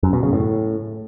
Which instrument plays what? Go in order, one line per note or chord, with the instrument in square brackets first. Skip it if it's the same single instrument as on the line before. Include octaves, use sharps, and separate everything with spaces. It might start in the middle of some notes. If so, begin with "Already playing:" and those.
[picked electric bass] F#2
B2
C#3
A2